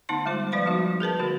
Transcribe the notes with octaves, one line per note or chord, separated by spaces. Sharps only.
D3 A3 B3 D#4 A5 C6
G3 G#3 F4 C5
F3 B4 D5 F5 B5
F3 G3 B3 D#4 F4 F#4
G#4 A#4 B4 A5
D3 A3 F#4